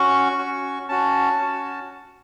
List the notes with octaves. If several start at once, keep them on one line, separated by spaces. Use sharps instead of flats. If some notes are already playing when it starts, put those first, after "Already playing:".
Already playing: C#4 F#4 C#6
C#4 F#4
C#4 F#4 A5
C#4 F#4